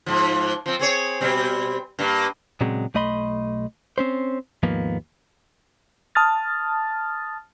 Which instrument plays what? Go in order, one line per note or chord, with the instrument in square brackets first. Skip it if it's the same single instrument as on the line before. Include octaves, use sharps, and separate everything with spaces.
[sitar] G#2 F3
F3 C4
C4 G#4 C#5
B2 G3 C4
G2 A#3
[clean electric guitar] A#2 C#3 F#3 G#3 C4
B1 A3 D#5 B5 C6
C4 C#4 C5
D#2 G#2 F3 A#3 B3
[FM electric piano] A5 D#6 F6 A6